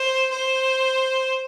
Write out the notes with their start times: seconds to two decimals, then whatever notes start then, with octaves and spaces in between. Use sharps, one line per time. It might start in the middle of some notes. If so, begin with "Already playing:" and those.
Already playing: C5
0.31 C5